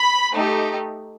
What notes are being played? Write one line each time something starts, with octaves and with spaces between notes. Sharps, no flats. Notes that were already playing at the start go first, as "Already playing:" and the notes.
Already playing: B5
A3 D#4 G4